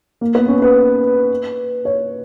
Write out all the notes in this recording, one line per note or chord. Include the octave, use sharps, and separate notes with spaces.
A#3
B3
C#4
B4
C#5